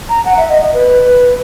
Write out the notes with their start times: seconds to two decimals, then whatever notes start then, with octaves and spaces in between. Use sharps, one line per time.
0.09 A#5
0.25 F#5
0.37 E5
0.49 D#5
0.61 D#5
0.74 B4